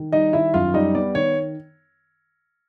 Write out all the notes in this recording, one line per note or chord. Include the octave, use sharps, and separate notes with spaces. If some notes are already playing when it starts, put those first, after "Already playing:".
Already playing: D#3
G3 D#4 D#5
D#3 E4 E5
F#2 F4 F5
G3 D#4 D#5
B3 D5
D#3 C#5